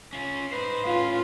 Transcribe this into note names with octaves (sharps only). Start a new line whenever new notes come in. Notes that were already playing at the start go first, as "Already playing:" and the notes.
C#4 F4
D#4 B4 C5
A2 C#4 F4